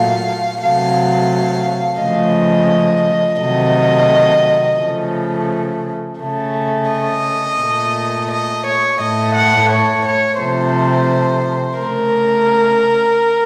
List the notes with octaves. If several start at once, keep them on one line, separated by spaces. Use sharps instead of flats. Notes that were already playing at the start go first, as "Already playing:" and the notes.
Already playing: A#2 F#3 A3 F5
C3 F#3 A3 F5
C#3 F3 A3 D#5
C3 D#3 F#3 A3 D#5
C#3 F3 A3
C#3 A3
D#5
A#2 A3
D#5
C#5
A2 A3 D#5
F#5
C#5
C#5
C3 F3 A3 C5
C#3 A3 A#4